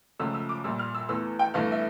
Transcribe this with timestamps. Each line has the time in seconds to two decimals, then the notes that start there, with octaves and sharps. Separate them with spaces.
0.20 C#2 C#3 F3 A3 E6
0.34 E6
0.49 D6
0.64 A#1 A#2 G3 E6
0.79 F6
0.95 E6
1.09 E2 E3 A3 E6
1.39 G5
1.54 G1 G2 E3 A3 F5
1.72 E5